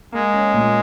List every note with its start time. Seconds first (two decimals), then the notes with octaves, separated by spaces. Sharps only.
0.12 G#3 A#3
0.34 C#4
0.54 A#2